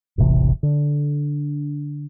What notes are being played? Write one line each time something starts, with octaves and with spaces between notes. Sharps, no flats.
E1 A1 C3 E3
D3